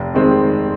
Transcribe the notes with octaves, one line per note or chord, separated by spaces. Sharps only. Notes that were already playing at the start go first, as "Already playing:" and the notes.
Already playing: F1
D#3 G#3 C4